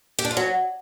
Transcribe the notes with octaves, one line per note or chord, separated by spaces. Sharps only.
G4
D4
F4
F#3